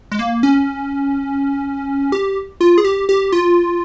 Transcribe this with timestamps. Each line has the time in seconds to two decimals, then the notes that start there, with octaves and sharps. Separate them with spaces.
0.12 G#3
0.19 A#3
0.43 C#4
2.12 G4
2.61 F4
2.78 G#4
2.85 G4
3.09 G4
3.32 F4